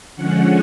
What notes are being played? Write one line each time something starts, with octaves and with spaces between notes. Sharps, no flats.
D3 F3 G#3 C#4 F#5